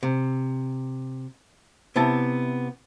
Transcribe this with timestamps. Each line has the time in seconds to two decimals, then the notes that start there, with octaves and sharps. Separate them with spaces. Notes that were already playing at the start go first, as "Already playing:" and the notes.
0.03 C3
1.96 C3 B3 E4 A5